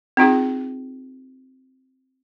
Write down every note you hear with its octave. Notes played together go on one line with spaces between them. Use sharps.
C4 D#4 F4 G#4